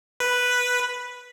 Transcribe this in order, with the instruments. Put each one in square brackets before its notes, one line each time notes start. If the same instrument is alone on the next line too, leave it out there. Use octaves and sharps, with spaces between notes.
[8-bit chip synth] B4